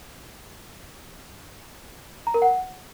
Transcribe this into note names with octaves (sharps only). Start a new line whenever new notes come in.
A#5
A#4
F#5